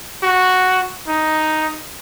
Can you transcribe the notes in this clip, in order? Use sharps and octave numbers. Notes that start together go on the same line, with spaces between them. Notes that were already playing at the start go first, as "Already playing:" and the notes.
F#4
D#4